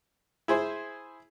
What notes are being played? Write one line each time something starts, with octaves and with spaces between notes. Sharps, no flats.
E4 G#4 C5